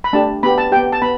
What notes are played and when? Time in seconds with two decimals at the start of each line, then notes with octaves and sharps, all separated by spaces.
0.04 B5
0.13 A3 D4 G4 A5
0.43 B3 G4 B5
0.58 A5
0.72 B3 G4 G5
0.92 A5
1.02 B3 B5